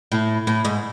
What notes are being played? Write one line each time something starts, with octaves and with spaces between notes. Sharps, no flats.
A2
A2
G#2